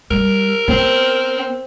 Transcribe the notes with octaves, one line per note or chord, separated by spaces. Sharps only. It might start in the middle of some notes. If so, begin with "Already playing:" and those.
G3 A#4
B3 C4